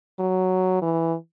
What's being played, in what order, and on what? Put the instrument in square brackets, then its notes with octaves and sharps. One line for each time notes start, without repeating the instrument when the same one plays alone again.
[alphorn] F#3
E3